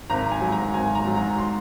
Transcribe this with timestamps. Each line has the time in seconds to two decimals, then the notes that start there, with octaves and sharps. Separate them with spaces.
0.10 G#1 A#5
0.31 G#5
0.41 G#2 F#3
0.52 A#5
0.74 G#1 G#5
0.95 A#5
1.05 G#2 F#3
1.16 A#5
1.38 C6